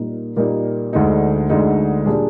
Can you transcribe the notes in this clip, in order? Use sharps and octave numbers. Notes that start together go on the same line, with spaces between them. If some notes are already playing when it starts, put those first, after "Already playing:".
Already playing: A#2 G3 A#3 D#4 A#4
A#2 G3 A#3 D#4 A#4
D2 D3 G#3 D#4
D2 D3 G#3 D#4
A#2 G3 D4 G#4